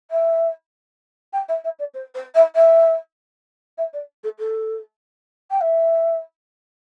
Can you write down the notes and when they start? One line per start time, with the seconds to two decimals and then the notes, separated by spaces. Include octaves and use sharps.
0.11 E5
1.33 G5
1.49 E5
1.64 E5
1.79 D5
1.94 C5
2.15 C5
2.35 E5
2.55 E5
3.78 E5
3.93 D5
4.24 A4
4.39 A4
5.51 G5
5.61 E5